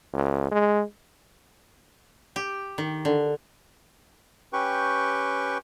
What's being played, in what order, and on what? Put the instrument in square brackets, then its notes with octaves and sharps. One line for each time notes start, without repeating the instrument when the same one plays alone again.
[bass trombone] C#2
G#3
[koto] G4
D#3
D3
[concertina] C#4 G4 B4 G5 C#6